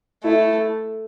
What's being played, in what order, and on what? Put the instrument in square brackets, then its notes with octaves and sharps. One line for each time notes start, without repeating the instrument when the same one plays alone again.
[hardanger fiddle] A3 [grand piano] E4